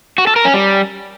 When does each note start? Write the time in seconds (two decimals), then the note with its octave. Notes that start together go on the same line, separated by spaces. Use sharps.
0.18 F#4
0.27 A4
0.36 A#4
0.45 C#4
0.54 G3